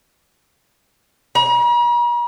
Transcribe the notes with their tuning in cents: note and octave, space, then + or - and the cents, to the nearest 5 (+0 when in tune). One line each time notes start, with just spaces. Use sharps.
A#5 +45